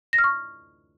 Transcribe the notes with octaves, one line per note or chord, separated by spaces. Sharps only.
A#6
F6
C#6